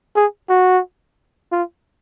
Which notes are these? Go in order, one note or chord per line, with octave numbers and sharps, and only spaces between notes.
G#4
F#4
F4